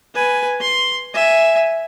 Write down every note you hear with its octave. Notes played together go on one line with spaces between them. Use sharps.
B4 G#5
C6
E5 G#5